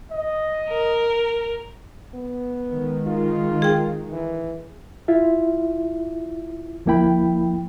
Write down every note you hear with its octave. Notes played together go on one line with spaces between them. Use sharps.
D#5
A#4
B3
D#3 G#3
F4
G#4 G5
E3
E4 F4 E5
D2 F3 A#3 E4 G5 B5